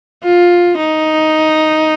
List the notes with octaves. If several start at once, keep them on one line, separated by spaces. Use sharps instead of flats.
F4
D#4